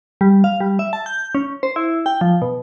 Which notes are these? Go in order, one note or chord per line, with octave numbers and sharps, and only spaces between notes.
G3
F5
G3
E5
A5
G6
C#4
C5
E4
G5
F3
B2